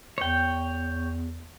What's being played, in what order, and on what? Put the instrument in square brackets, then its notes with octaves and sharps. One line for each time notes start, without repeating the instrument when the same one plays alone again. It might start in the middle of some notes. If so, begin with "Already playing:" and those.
[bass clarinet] E2 [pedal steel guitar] C#5 G5